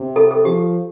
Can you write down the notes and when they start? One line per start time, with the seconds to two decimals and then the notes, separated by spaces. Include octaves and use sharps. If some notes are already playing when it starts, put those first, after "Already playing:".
Already playing: C3
0.16 A4
0.31 A4
0.45 F3 G4